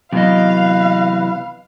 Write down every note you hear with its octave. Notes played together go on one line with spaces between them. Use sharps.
C3 E3 F#3 B3 B4 D#5 F5